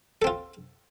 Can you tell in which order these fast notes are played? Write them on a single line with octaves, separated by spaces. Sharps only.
A4 C4 F4